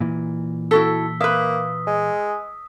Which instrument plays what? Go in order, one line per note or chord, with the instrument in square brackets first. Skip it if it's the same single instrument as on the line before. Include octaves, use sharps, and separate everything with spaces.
[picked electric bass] A#2 E3
[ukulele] E4 F#4 A4 [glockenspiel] E6 B6 G7
[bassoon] A#3 [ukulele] B4 E5 [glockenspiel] D#6
[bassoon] G#3